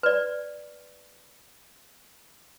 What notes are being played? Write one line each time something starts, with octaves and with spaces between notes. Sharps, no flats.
B4 D5